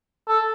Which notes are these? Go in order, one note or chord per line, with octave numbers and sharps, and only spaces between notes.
A4